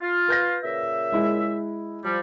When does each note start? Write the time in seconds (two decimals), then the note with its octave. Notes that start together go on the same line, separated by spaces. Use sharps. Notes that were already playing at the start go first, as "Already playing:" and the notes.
0.02 F4
0.28 B4 G6 A#6
0.64 A#2 C#3 E5
1.12 G#3 E4
2.05 F3 G3